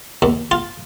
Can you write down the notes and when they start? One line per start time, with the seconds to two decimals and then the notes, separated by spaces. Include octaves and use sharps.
0.22 D#2
0.51 F4